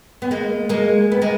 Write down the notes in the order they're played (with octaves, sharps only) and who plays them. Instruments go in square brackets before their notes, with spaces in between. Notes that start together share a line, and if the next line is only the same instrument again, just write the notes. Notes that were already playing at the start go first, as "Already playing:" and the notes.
[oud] B3
G#3 A#3
G#3 A#3
B3
G#3 A#3